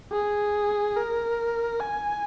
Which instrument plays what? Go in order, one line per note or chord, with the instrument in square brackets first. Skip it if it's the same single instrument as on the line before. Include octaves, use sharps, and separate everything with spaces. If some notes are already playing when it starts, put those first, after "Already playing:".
[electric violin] G#4
A#4
G#5